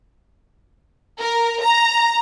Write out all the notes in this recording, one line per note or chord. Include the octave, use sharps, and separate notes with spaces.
A#4
A#5